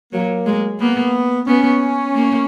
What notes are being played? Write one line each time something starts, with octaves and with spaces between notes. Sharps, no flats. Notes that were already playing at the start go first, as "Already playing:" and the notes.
F#3 A#3
G#3
A#3 B3
B3 C#4
A#3